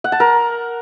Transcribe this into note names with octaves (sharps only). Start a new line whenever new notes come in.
F#5
A5
A#4